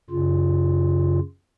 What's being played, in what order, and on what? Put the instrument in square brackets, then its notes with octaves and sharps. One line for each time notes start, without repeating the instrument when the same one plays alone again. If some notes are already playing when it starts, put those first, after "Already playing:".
[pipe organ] F#2 C#3 F4